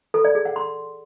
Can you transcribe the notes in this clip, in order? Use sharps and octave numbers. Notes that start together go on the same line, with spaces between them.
A4
D5
G#4
F#5
C6